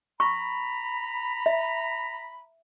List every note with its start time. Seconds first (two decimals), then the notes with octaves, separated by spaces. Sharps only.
0.20 A#5 B5 C#6
1.46 E5